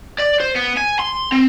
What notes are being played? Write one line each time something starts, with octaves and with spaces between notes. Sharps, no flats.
D5
C5
B3
G#5
C6
C4